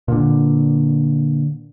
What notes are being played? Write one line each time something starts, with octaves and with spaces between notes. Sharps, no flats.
A#2 D3